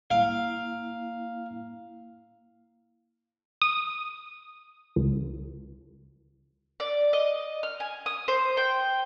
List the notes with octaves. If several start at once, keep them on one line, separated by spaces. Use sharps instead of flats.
A#3 E4 F5
D#6
C#2
D5
D#5
F6
G#5
D#6
C5
G5